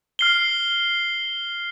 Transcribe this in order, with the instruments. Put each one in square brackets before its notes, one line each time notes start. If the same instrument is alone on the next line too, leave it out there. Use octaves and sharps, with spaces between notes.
[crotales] F6 C7 G7